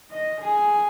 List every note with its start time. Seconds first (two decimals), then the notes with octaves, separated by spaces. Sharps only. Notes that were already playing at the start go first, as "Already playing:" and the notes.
0.11 D#5
0.40 G#4